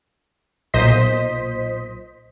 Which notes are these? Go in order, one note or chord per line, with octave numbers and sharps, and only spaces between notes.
B1 A#2 C5 D#5 B6